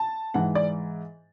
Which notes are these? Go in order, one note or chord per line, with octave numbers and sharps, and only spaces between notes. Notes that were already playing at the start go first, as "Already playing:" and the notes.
Already playing: A5
G#2 E3 F#5
D5